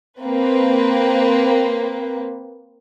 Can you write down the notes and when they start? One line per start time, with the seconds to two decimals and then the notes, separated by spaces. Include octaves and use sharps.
0.21 A#3 C4 B4